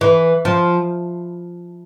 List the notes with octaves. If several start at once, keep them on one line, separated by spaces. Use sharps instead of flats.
E3
F3